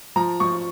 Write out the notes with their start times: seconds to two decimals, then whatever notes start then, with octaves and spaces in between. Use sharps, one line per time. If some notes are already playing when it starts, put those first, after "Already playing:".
0.16 F3 A#5
0.40 F3 C#6